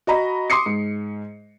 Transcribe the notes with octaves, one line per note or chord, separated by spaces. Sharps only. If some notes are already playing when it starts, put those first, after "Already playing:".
F#4 D#5 A#5 B5
C6 D6 D#6 C7 C#7
G#2